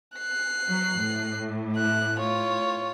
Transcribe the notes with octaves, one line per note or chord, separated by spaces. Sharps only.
F#6 C7
F#3
A2
E4 F#6
F4 C#5